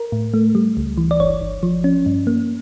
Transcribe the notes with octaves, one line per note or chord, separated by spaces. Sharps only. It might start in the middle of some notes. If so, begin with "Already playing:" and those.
Already playing: A#4
A2
A3
G3
C#2
E3
D5
G1 C#5
G1
F3
C#4
G2
A#3